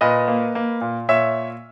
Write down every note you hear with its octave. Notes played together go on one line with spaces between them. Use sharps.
A#2 B4 D#5
A#3
A#3
A#2
A#2 C#5 E5